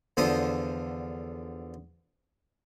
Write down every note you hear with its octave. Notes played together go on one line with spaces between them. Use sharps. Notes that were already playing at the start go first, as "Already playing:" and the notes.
E2 D3 F3 F4 C5 D#6